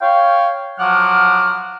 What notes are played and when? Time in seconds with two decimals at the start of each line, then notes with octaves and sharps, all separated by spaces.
0.01 C#5 F5 G5
0.79 F3 F#3 F#5 D6 F6